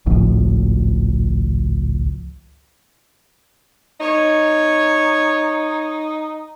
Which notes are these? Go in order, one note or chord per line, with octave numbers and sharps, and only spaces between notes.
G#1 C#2 A2 F3
D#4 C#5